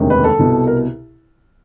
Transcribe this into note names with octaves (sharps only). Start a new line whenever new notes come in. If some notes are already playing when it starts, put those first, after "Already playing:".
Already playing: E1 D2 C3 D#3
B4
A4
C2 B2
A#4